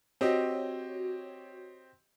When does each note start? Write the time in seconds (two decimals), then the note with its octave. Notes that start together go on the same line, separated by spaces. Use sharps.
0.21 C4 F#4 G4 C#5 D#5